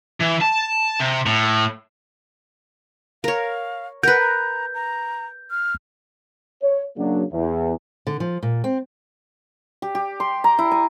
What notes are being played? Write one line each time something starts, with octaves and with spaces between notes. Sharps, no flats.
E3
A5
C3
A2
A#4 C#5 F5
A#4 B4 F#5 G6
A#5
A#5
F6
C#5
C#3 F#3 A#3 D4
E2
D3
F3
A#2
C4
G4
G4
C6
A#5
E4
G#5